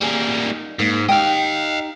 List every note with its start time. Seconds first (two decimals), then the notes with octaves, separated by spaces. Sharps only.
0.02 G3 A#3 G#4
0.44 D#4
0.79 G#2 A#3
1.09 D#4 G4 D#5 F5 G5